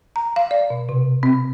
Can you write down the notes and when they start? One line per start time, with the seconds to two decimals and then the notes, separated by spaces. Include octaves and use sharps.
0.16 A#5
0.36 F5
0.51 D5
0.70 B2
0.89 C3
1.23 C4